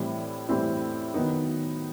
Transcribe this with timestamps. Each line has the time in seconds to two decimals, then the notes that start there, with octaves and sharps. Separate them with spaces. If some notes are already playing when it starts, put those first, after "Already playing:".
Already playing: A2 E3 G3 C4 E4
0.49 A2 E3 G3 C4 E4
1.14 D#3 F#3 B3 D#4